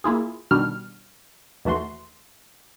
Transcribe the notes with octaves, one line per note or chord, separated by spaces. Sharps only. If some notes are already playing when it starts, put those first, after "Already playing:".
A#3 E4 F4 G#4
B2 D#3 G3 D4 F#4 F6
D#2 E3 A3 F#4 C6